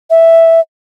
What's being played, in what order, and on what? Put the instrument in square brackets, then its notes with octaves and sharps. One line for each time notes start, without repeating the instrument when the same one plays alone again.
[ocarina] E5